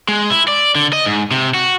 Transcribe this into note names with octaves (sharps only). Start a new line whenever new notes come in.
G#3
E4
D5
D3
D#5
G#2
C3
F#4